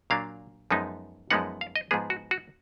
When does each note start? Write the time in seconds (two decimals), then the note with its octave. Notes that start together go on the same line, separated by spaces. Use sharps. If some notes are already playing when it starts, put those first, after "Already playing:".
0.10 A#2 F#3 A#3 D4 F5
0.71 F#2 F3 G#3 B3 D#4
1.30 F#2 F3 G#3 B3 D#4 F#5
1.61 F5
1.76 D#5
1.91 G#2 F3 G#3 B3 G#4
2.10 F#4
2.31 F#4